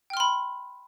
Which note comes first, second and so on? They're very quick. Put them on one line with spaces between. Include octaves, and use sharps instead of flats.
G5 F6 C6 B5